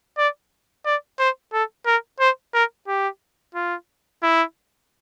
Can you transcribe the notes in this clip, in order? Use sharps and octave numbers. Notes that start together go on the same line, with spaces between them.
D5
D5
C5
A4
A#4
C5
A#4
G4
F4
E4